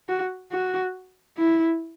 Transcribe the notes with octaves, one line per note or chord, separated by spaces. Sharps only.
F#4
F#4
E4